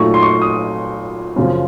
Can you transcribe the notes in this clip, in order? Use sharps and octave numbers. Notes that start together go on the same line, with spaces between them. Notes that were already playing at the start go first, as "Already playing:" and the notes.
Already playing: A#2 F#3 A3 D#4 C#6
C6
C#6
D#6
F#2 C#3 F3